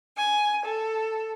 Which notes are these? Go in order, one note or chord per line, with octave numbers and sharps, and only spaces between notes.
G#5
A4